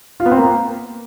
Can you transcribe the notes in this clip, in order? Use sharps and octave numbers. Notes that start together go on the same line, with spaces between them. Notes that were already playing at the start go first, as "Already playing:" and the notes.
F4
B3
C4
A#3